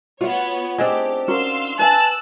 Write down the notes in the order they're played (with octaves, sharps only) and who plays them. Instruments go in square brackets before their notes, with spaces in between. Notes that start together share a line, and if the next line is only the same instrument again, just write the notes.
[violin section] B3 C#5 [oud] F4 [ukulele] F#4 F#5
[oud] C4 D4 D#4 [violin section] G4 [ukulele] G#4
[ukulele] C#4 F#4 A#4 [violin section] F5 C6 E6
[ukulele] B4 G#5 [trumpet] A5 [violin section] E6 F#6